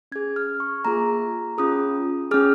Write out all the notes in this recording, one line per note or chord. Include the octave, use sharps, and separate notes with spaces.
C#4 G#4 G#6
F6
C#6
A#3 F4 G#4 A#5
C#4 F4 G#4 D#6
C#4 G#4 F6